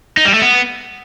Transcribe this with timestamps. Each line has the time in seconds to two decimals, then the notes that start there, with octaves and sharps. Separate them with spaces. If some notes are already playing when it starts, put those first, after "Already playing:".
0.17 D#4
0.25 G3
0.34 A3
0.42 B3